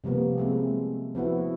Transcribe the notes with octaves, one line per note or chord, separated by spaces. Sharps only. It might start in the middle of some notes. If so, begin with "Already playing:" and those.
C3 F3 G3 A#3 B3
G#3 A3 C4
F3 B3 E4 F#4